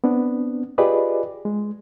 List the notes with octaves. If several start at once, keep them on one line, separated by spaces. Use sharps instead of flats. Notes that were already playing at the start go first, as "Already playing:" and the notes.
B3 C4 D4
F4 G4 G#4 B4 D5 D#5
G#3